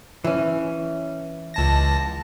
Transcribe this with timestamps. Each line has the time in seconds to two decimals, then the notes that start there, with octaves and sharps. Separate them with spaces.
0.24 E3 C#4
1.54 C#2 A5 A#6